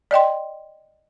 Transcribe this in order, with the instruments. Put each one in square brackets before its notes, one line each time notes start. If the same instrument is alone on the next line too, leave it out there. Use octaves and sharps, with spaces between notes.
[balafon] D5 D#5 G5 C6